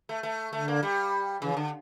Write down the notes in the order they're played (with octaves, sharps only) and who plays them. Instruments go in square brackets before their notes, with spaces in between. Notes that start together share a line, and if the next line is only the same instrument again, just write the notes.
[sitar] A3
A3
[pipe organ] D3 [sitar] A3
[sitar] A#3
G3
[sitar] C#3 [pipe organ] E3
[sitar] D3